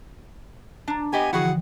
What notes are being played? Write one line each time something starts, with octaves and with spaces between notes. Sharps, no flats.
D4 A5 A#5
B3 G4 D#5 G5 G#5
D3 E3 F3 E4 F#4 G#4 F#5